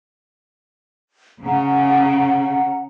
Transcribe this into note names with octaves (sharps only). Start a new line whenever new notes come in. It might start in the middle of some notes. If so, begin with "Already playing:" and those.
C#3 F#5 A#5